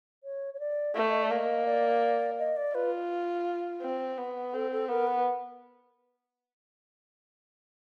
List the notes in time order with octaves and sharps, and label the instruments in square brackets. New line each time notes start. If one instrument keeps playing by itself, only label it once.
[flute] C#5
C#5
D5
[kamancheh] A3
[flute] D#5
D5
[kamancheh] A#3
[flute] D#5
D5
D#5
D5
[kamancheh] F4 [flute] B4
[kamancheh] C4
B3
[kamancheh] C4 [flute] A4
[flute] A4
[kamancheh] B3 [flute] A#4
[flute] B4